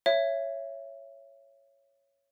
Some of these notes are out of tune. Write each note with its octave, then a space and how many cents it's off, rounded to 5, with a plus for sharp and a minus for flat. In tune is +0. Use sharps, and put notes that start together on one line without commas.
C#5 +0 E5 +20